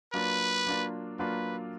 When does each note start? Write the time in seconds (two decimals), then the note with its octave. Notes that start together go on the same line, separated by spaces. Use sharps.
0.13 F#3 A#3 D4 F4 B4
0.67 F#3 A#3 D4 F4
1.19 F#3 A#3 D4 F4 B4